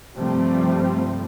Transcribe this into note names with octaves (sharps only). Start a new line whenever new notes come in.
G2 C3 F3 G3 A3 C4